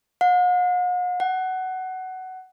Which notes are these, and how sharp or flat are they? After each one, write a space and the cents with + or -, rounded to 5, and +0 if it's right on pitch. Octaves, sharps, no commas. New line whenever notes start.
F#5 -45
F#5 +15